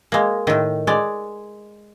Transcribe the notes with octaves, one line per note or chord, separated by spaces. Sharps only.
G#3 A#3
A2 D#3
G#3 D5